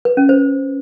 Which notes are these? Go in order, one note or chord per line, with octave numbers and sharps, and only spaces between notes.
B4
C#4
C5